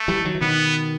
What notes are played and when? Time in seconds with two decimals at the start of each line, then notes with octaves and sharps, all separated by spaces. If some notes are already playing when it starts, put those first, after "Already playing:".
Already playing: A3
0.08 E3 G3
0.25 D#3 F#3
0.35 E3
0.41 B2 D#3 B3